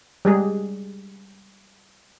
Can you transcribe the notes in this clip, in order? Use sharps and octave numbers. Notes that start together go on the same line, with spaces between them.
G3 G#3 G#4